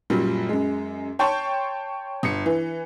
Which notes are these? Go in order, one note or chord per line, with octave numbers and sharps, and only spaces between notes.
F#2 A#2 F#3 G3 A#3
F#2 G#3
C#5 G5 A5 C6 C#6
G1 C#7
E3